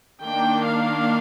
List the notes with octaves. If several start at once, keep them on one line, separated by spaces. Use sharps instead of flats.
D#3 A#3 D4 G5
F5